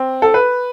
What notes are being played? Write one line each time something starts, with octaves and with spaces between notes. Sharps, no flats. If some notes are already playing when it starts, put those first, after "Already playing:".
Already playing: C4
A4
B4